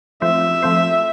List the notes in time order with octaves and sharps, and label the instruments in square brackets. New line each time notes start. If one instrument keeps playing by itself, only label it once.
[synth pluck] F3 A3 C4 F4 C5 [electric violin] E5
[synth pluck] F3 A3 C4 F4 C5